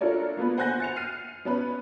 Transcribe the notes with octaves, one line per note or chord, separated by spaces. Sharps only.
D4 F4 A4 A#4 C#5 D5
A#3 B3 F4 B4
C5 F#5 G#5 F#6 G6 A#6
A6 C#7 F7
F6 C7 D#7
B3 C#4 B4